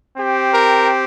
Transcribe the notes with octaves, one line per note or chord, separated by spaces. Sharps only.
C4 G4
A#4